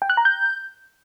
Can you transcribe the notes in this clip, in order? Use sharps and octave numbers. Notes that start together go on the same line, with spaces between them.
G5
F#6
A#5
G6